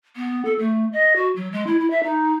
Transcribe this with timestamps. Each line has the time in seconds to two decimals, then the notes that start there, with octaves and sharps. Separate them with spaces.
0.16 B3
0.45 A4
0.59 A3
0.93 D#5
1.16 F#4
1.36 F#3
1.52 G#3
1.67 E4
1.79 E4
1.91 E5
2.03 D#4